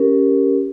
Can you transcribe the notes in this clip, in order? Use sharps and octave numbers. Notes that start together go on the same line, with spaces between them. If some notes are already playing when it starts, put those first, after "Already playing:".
Already playing: C#4 G4 A#4